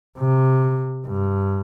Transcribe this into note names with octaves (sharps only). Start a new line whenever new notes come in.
C3
G2